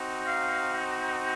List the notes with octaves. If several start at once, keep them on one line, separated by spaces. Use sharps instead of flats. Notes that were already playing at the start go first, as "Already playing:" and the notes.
Already playing: C4 D#4 F#4
F5